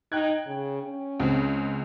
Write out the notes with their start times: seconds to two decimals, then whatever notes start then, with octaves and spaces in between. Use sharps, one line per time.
0.12 D#4 G5 F#6 G#6
0.46 C#3
0.83 C#4
1.20 C#2 C#3 C4